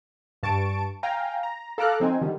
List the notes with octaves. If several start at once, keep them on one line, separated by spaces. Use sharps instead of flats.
G2 A5 C#6 D7
F5 G5 G#5 A#5
A#5
A4 F5 A#5 D6 F6 F#6
F3 C4 D#4 G#5
D3 D#3 G3